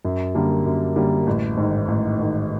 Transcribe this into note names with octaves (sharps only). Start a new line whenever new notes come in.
F#2
D3 G3 A#3
F#2
D3 G3 A#3
A1
G#2 D#3
A1
G#2 D#3